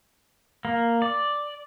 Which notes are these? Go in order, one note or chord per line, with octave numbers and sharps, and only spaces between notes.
A#3
D5